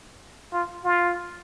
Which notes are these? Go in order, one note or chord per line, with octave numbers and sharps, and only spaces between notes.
F4
F4